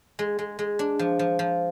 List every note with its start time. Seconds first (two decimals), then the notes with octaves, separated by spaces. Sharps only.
0.19 G#3
0.39 G#3
0.59 G#3
0.79 D4
0.99 F3
1.19 F3
1.39 F3